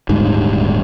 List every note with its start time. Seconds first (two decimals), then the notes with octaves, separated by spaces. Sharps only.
0.09 D#1 D2 G#2 G3